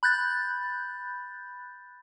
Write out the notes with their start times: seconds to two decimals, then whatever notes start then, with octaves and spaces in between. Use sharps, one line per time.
0.03 B5 F#6 G6 A6